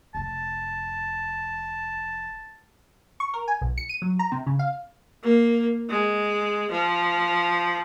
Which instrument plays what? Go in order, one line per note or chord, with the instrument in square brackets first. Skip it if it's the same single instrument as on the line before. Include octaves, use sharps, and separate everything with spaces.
[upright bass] F1 F2 [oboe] A5
[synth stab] C#6
A#4
G#5
B1
C#7
D#7
F#3
A#5
C3
C#3
F5
[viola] A#3
G#3
F3